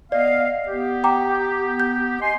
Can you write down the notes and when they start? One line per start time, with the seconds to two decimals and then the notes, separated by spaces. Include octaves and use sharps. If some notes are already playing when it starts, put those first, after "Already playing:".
0.12 B3 D5 D#5 F5
0.68 B3 G4
1.04 G5 A#5 D6
1.80 G6
2.21 D#5 G#5 C6